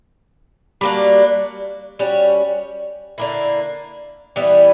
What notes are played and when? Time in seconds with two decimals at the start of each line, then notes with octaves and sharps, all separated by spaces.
0.81 G3 A#3 D4 F#4
1.99 G3 C#4 F#4
3.18 D3 A#3 E4
4.36 E3 G3 B3